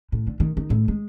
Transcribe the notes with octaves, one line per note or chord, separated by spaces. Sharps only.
A2
D3
D#3
D#3
A2
G#3